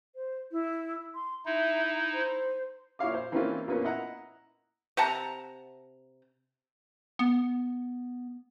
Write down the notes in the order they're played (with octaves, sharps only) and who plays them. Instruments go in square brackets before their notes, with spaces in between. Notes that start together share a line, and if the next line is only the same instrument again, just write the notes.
[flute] C5
E4
C6
[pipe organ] D#4 E4 [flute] E5
[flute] C5
[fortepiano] A#2 E4 C#5 F5 D6
C5
E3 A#3 C4 C#4 D#4 F4
A#2 A#3 B3 C#4
E4 D#5 E5 F#5 A#5
[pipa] C3 F#5 A5 A#5
[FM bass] B3